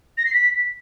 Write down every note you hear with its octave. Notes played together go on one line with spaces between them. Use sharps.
A#6
C7
B6